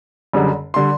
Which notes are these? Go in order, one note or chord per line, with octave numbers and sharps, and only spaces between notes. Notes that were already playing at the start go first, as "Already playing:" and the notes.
F#1 F#2 D3 G3
D3 G3 C6